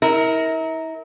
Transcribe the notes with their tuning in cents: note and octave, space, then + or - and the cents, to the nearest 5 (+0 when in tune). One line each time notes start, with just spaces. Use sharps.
E4 -40 A#4 +0